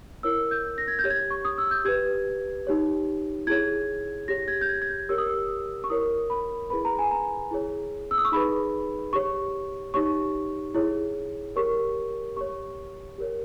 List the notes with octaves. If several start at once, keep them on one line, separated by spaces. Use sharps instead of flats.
E4 A#4 C#5 E6
G6
A#6
G#6
G6
G4 C#5
G#6
C#6
D#6
E6
G6
G4 B4 G#6
D#4 G4 C#5
E4 G#4 C#5 G#6
G4 C#5 A#6
G#6
G6
G#6
G#6
G6
G4 A#4 C#5 E6
D#6
E6
C#6
E4 A#4 C#5 D#6
B5
E4 G#4 B4 B5
A#5
G#5
A#5
E4 G#4 C#5
E6
D#6
C#6
D#4 G#4 B4 B5
G4 C#5 C#6
D#4 G4 C#5 C#6
E4 G#4 C#5
G4 A#4 C#5 C#6
G4 C#5 C#6
G4 A#4 C#5